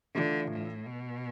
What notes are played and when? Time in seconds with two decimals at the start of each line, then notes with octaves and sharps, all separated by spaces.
0.15 D3 E3 A3 D4 F4
0.51 A2
0.86 B2